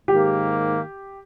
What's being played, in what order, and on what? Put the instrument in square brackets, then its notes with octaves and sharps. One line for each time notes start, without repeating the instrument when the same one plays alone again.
[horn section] G#2 D#3 A#3 [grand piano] G4